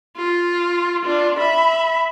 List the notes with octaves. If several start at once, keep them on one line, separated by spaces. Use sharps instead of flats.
F4
D4 F4
E5 B5